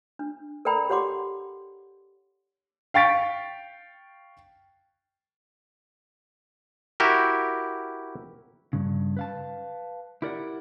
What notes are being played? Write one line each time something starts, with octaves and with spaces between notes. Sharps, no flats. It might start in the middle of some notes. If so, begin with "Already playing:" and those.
D4
A4 A#4 D5 G5 A#5 B5
G4 C#5 F#5 C6 D6
F5 G5 C#6 A6 B6 D7
E4 F#4 G4 A#4
G2 C#3
B4 F5 A5
E4 G4 A#4 D5 D#5 F#5